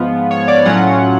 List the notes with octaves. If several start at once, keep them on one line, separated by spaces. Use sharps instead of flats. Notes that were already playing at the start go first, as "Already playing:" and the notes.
Already playing: G#2 F3 B3 F4
C#5
D5
A2 F#3 C#4 F4 F#5